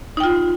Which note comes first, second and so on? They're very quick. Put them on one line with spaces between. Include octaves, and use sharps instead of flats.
D#4 G5 F4